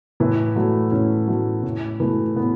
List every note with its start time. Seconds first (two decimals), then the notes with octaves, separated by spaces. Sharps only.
0.20 A2 E3 E4
0.56 F#3 A3
0.92 A2 C#4
1.28 F#3 A3
1.63 A2
2.00 E3 A3
2.36 A2 B3